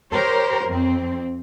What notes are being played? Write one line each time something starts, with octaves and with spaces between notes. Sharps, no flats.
G4 A#4 C5 C#5
F2 C4